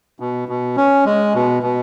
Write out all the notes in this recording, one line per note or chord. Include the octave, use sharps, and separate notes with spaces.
B2
B2
C#4
G#3
B2
B2